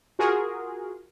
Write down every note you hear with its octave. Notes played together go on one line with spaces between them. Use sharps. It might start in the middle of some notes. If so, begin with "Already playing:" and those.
F4 F#4 G#4 A#4